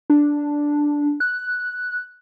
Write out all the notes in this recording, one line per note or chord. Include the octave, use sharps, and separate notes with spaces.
D4
F#6